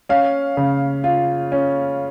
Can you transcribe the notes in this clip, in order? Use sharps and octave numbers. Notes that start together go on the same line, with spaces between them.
C#4 F5
C#3
F4
C#4